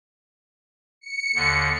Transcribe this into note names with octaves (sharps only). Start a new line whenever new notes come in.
C#7
D#2 D3